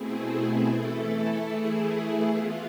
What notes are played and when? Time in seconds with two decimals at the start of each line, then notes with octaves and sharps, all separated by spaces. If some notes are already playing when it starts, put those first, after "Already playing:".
Already playing: B2 A3 C4 E4 G#4
0.67 E3 A3 E4 A4
1.49 E3 A3 E4 G#4
2.31 E3 B3 F4